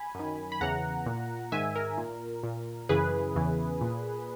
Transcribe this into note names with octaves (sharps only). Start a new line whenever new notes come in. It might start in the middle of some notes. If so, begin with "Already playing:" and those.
Already playing: G#5 B5
F#2 D#3
B5
E2 C#3 E3 F#5 A#5
A#2
G#2 D#3 E5 G#5
A#4
A#2
A#2
F#2 C#3 E3 G#4 B4
E2 C#3 E3
A#2